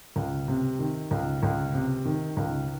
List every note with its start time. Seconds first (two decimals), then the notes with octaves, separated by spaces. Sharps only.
0.16 C#2
0.48 C3
0.79 D#3
1.11 C#2
1.43 C#2
1.74 C3
2.05 D#3
2.37 C#2